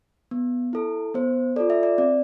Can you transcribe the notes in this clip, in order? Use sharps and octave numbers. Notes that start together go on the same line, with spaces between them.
B3
E4 A4
B3 C5
F4 A4 D5
E5
D5
C4 D5